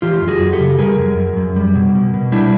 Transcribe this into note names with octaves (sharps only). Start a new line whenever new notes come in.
E3 F4 G4
F#2
F#4 G#4
F#2
G4 A4
C#3
G3 G#4 A#4
F#2
F#2
F#2
G3
B2
B2
B2
G3 D4 E4